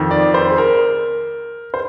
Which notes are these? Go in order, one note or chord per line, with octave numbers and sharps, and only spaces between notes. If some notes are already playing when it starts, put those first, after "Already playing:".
Already playing: F2 D#3
D5
C5
G#4
A#4
C5